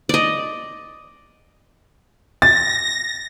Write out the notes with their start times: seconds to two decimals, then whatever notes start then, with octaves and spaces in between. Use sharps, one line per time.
0.09 D5 D#5
2.42 A6 A#6